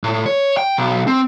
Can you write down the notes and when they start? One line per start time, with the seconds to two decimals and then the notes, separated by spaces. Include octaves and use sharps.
0.04 A2
0.26 C#5
0.57 G5
0.77 B1
1.07 C4